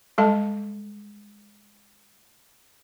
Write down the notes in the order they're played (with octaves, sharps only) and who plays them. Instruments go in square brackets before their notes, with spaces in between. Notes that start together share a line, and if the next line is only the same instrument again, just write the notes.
[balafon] G3 G#3 A4 D#5 A5